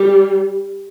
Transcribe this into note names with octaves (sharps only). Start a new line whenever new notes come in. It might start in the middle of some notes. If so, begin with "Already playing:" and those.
Already playing: G3